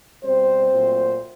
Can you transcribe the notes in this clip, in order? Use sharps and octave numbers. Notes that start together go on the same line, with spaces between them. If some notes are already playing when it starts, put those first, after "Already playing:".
B2 G3 C4 C5
A#2 F#3 A3